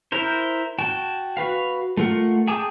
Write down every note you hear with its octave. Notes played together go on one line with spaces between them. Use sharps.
E4 A#4 C5
F#4 G5 A5
F#4 B4 F5
A3 F4 A#4 F#5
G#4 G5 A5 D6 D#6